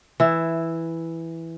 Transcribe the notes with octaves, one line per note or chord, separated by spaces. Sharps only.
E3 E4